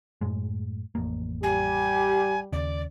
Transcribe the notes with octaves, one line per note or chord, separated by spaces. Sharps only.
F#2 A2 G#3
A1 F2 A#3
G3 G4 G#5
D#2 C#3 D5